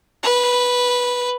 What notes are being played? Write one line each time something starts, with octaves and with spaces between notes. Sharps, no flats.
B4